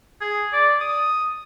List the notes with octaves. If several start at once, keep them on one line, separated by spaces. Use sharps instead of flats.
G#4
D5
D#6